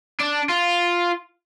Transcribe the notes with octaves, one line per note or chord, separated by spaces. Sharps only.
D4
F4